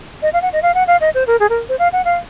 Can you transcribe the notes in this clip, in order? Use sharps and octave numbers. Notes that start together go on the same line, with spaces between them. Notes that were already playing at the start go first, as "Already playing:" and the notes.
D#5
F5
F#5
D#5
F5
F#5
F5
D#5
C5
A#4
G#4
A#4
C5
F5
F#5
F5